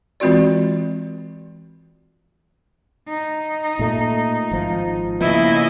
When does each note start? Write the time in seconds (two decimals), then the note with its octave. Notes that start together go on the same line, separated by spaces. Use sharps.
0.20 E3 G#3 C4 F4 F#4 D5
3.08 D#4
3.79 A#2 A3
4.52 G#1 F3
5.20 C#3 F3 A#3 B3 E4 D#5